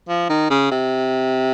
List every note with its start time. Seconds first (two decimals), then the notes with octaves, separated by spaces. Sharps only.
0.08 F3
0.29 D#3
0.50 C#3
0.71 C3